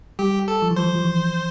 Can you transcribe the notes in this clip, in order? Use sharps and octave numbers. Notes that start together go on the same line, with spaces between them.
G3 G4
A4
F3
E3
F3 C5
F3
E3